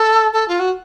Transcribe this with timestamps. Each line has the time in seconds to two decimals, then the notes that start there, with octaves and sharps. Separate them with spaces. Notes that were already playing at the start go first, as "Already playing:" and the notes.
Already playing: A4
0.33 A4
0.48 F4
0.59 F#4